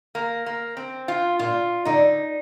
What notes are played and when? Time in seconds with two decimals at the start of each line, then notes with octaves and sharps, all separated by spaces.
0.15 A#3
0.46 A#3
0.77 C4
1.08 F4
1.39 A#2 F4
1.85 D3 D#4